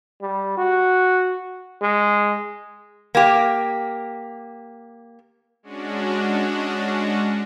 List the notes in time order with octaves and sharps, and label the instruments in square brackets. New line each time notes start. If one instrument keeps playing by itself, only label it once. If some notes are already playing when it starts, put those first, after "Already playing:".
[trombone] G3
F#4
G#3
[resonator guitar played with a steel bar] A#3 G4
[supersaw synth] G#3 C#4 D4 F#4